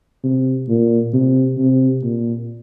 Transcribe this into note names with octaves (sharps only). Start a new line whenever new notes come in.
C3
A#2
C3
C3
A#2